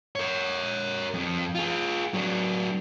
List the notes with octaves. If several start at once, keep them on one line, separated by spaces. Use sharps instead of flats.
A#4 C#5
F2
F4 G#4
F#3 D4